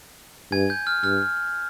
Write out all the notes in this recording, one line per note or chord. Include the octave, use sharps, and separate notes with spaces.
G2 G#5 G#6
G6
F6
G2 F6